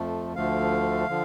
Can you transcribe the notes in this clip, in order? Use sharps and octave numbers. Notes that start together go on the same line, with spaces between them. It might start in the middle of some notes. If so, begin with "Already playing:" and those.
Already playing: F2 F3 A3
D2 D3 F3 A3 F5
D3 F3